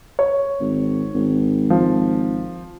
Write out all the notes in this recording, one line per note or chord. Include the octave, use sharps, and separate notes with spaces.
C#5
G#1
G#1
F3